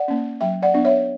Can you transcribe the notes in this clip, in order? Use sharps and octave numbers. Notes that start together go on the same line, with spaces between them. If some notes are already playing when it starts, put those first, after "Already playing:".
Already playing: D5 F#5
A#3 C#4
F#3 E5 G5
D5 F#5
B3 D4
C#5 E5